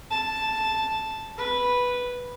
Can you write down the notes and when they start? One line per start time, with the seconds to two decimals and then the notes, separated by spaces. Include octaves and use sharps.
0.11 A5
1.38 B4